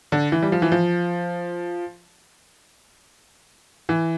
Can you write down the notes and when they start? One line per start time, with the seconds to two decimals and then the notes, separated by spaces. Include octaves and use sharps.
0.12 D3
0.32 E3
0.42 G3
0.52 F3
0.62 E3
0.72 F3
3.89 E3